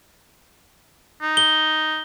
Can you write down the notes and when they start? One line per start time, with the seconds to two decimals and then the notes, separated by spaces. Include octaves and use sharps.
1.22 D#4
1.37 G7